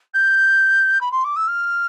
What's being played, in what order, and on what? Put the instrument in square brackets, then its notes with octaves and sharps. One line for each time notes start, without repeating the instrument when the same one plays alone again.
[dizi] G6
B5
C6
D6
E6
F6